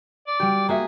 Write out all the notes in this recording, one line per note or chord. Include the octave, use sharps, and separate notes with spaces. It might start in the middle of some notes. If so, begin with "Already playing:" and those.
D5
G3 F#4 G4
A#3 F#4 G#4 E5